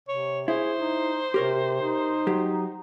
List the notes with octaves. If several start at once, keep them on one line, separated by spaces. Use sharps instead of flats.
C3 C#5
E4 G#4 C5
D#4
C3 G4 A#4 C#5
D#4
F#3 G4